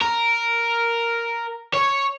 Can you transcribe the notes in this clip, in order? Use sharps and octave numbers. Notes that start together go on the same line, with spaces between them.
A#4
C#5